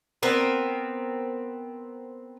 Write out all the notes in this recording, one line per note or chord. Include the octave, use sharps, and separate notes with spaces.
B3 C4 A#4